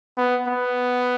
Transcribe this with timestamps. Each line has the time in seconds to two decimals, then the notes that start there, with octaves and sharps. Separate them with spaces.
0.17 B3
0.48 B3